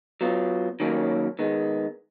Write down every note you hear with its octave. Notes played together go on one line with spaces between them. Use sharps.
F#3 B3 F4
D#3 F#3 A#3 C#4
D#3 G#3 B3